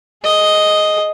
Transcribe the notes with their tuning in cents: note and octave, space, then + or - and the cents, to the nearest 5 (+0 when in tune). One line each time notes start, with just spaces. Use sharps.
G#4 +15 D#5 +0